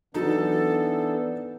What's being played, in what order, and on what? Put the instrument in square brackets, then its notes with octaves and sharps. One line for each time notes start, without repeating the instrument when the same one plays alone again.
[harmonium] E3 B3 D4 [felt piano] F#3 D#4 [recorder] A4